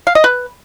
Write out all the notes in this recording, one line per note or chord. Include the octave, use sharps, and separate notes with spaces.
F5
D#5
B4